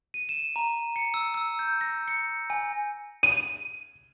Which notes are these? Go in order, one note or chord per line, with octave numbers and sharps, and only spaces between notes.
D#7
E7
A#5
C#7
E6
E6
G6
A#6
C#7
G#5
D#7